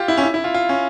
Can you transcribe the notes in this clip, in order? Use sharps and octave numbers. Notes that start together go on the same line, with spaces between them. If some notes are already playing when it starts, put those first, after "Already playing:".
Already playing: F4 G4
E4
C#4
E4
E4
F4
F4
C#4